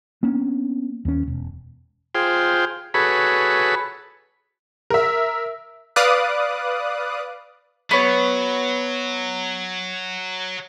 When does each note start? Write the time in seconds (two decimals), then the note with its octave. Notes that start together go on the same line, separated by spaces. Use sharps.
0.23 A#3 B3 C#4 D4
1.05 D#2 C#4
1.27 E1
2.15 F4 G#4 C5 G5
2.94 F#4 G#4 A4 B4 C#5 B5
4.90 A#4 E5
5.96 B4 D5 F5 D6 D#6 F#6
7.91 F#3 B3 C#5